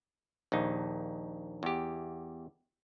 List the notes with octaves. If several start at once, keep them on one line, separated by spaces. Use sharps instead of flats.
A#1 D#2 D#4
E2 G4